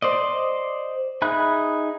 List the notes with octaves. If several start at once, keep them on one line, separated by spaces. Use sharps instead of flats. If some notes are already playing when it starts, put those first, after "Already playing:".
C5 D5 D#5
D#4 G#4 E5 B5 F#6